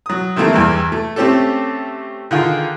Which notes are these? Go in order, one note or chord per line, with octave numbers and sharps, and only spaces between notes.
F#3 D#6
C3 D#3 E3 A3 A#3
E2 G2 E3
A3
A3 C4 C#4 G4 A4
D3 D#3 F4 G#4